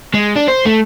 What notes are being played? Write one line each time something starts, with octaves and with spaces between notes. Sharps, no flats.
G#3
D4
C5
A3